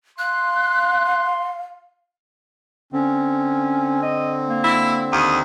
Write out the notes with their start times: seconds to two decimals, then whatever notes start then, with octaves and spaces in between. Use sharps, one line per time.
0.19 F5 C6 F#6
2.93 D3 C4 C#4
4.02 D#5
4.47 A#3
4.64 E4
5.13 D#2 D#6